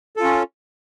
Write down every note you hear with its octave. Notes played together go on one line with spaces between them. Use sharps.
C#4 F4 A4